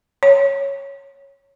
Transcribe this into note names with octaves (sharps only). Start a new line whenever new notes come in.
C#5